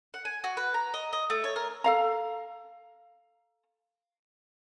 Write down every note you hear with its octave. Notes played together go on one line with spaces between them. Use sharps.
F#5
G#5
F#4
B4
A#5
D#5
D#5
A3
C#5
A#4
A4 F5 A#5